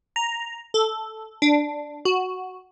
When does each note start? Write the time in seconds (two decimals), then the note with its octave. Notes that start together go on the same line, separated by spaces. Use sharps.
0.16 A#5
0.74 A4
1.42 D4
2.05 F#4